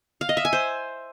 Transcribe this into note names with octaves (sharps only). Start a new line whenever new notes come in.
F5
D#5
E5
G#5
C5